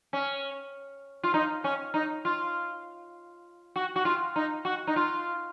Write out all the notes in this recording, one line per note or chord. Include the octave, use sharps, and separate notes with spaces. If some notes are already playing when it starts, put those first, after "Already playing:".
C#4
F4
D#4
C#4
D#4
F4
F#4
F#4
F4
D#4
F#4
D#4
F4